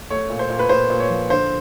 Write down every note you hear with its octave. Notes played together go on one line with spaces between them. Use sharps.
A3 C#5
A#2
C5
A#2
B4
A#2 C5
A#2
C#5
F3
D3 C5